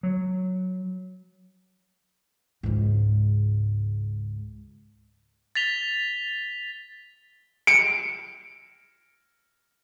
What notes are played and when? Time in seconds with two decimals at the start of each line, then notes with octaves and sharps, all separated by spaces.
0.03 F#3
2.63 C#2 G#2
5.55 A6 B6 F7 G7
7.67 C#7 D7